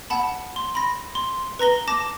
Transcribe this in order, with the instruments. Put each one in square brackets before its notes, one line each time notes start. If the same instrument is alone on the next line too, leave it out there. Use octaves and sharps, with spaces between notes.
[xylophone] F#5 A5 B5
C6
B5 A#6
C6
B4 A#5 A#6 G7
A5 D6 A#6